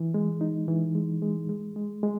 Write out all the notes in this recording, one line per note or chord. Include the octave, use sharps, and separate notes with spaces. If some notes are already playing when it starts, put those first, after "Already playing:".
Already playing: E3
G#3
D#4
E3
G#3
G#3
G#3
G#3
G#3